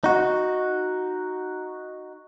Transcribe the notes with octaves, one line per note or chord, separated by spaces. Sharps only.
D#4 F#4